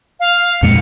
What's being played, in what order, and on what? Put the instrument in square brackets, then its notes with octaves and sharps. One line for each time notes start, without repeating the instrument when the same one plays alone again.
[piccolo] F5
[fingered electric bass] F2 A#2 G#3 [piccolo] C#7